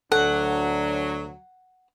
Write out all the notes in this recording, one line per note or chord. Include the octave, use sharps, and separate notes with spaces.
D2 F#3 D4 A4 F#5